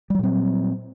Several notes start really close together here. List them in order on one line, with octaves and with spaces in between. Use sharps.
G3 F#3 A#2 C4